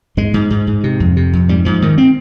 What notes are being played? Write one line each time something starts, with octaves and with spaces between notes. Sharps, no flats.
G#2 G#3
G#2
G#2
G#2
C3
F2
C3
F2
G#2 G3
G#2 F3
G#2 D#3
C4